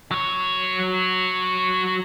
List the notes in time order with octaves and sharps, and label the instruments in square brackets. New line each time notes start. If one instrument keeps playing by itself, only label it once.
[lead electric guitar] F#3 C#5